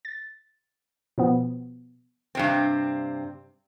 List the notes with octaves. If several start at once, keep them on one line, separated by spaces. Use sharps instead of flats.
A6
B2 F3 B3
G2 C3 C4